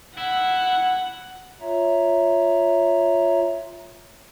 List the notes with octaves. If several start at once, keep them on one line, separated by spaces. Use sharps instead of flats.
E4 F#5
F4 C#5 E5 A#5